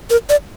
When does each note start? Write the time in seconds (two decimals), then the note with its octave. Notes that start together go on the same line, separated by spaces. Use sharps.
0.10 A#4
0.29 D5